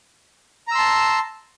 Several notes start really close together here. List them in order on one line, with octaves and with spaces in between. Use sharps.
A#5 E6 C6 A5